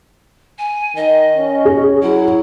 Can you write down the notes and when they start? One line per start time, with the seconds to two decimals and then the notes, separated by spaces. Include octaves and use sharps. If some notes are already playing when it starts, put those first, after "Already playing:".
0.59 G#5
0.96 D#3 D#5
1.37 C#4
1.65 G#4
2.02 F#3 E4